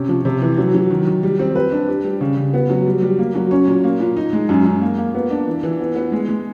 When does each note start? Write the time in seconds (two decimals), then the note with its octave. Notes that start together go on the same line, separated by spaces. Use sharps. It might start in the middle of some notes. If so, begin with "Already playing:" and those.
Already playing: C3 C#4
0.09 F3
0.25 C3
0.42 E3
0.58 F#3
0.74 F#3
0.91 D#3
1.07 D#3
1.23 G3
1.39 C4
1.55 B4
1.72 D4
1.88 G4
2.04 G3
2.21 C#3
2.37 C#3
2.54 B3
2.70 F#3
2.86 G3
3.02 G3
3.19 A#3
3.35 F#3
3.51 C#4
3.67 A#2
3.84 A#3
4.00 A#2
4.17 D#4
4.33 G#3
4.49 F#2
4.65 F#2
4.82 A#3
4.98 A#3
5.14 B3
5.30 D4
5.47 E3
5.63 E3
5.80 B3
5.96 B3
6.12 G#3
6.29 G#3